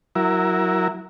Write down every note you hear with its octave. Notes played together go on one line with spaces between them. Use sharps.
F#3 E4 A#4